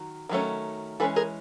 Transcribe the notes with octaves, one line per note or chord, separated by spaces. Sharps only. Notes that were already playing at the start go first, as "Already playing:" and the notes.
Already playing: D#3 F#3
D#3 F#3 A3 C#4
E3 G#3 C#4 A4 B4
G#4 A#4